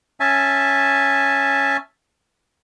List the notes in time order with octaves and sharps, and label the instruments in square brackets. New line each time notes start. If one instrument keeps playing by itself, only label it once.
[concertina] C#4 E5 G#5 A5